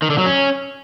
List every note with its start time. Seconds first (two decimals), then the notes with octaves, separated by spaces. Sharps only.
0.02 D#3
0.10 D3
0.18 F#3
0.26 C#4